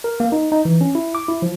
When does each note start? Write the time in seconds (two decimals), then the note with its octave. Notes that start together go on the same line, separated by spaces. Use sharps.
0.04 A#4
0.20 A#3
0.32 D#4
0.52 D#4
0.65 E3
0.81 C#4
0.95 E4
1.15 D6
1.29 E4
1.42 F3